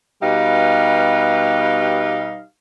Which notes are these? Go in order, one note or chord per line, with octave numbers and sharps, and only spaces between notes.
B2 G3 D#4 G4 B4 F5